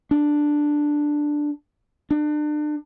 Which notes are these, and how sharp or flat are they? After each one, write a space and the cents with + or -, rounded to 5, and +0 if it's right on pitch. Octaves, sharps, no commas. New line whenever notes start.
D4 +5
D4 +35